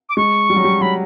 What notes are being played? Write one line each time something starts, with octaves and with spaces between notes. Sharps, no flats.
D6
G#3 C#6
G3
F#3
G3
F#3 B5